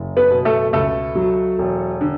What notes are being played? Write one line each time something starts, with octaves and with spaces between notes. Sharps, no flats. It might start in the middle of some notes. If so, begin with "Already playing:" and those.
Already playing: F#1
B3 B4
B2
A3 A4
C#2 A3 A4
F#3
E1
D3